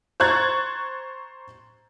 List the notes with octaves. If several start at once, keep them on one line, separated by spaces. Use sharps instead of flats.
C5 A#5 C#6 F#6 G#6 A6